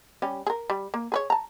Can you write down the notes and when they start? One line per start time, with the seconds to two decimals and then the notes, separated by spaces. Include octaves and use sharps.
0.22 G3 C#4 G4
0.46 G#4 A#4
0.70 G3
0.94 A#3
1.12 G#4 B4 C#5
1.30 A5 A#5